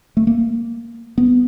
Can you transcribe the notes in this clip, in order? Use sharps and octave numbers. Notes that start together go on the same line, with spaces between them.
A3
A#3
B3